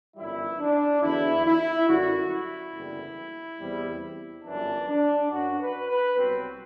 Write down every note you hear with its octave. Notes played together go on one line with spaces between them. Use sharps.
G1 F#2 E3 G3 E4
D4
E2 D3 F#3 E4
E4
F#2 D3 G3 F#4
E4
F#1 E2 D3 G3
E2 C3 G3
G1 F#2 E3 D4
D4
F#2 F#3 F#4
B4
B4
C2 B2 F#3 C4